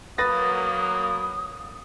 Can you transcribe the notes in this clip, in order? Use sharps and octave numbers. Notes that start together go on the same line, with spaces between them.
F#3 A#3 B4 D#6 A6 A#6